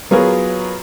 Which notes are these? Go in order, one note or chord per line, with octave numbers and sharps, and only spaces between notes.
F#3 B3 F4 G#4 A#4 C#5